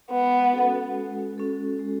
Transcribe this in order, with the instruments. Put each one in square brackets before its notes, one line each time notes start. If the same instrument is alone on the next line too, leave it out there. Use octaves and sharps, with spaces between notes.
[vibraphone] G#3 [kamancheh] B3
[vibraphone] C#4 F#4 A4
G#3
C#4 F#4 A4
G#3